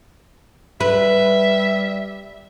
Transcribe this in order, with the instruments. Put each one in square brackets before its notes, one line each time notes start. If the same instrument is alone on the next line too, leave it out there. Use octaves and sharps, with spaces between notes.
[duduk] G3 [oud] B4 [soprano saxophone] E5